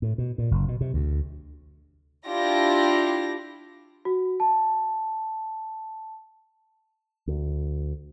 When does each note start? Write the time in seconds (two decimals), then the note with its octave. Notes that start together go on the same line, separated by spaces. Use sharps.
0.02 A2
0.18 B2
0.38 A#2
0.51 F#1
0.68 B2
0.81 C3
0.94 D2
2.27 D4 E4 F4 G4 A#6
4.05 F#4
4.40 A5
7.27 D2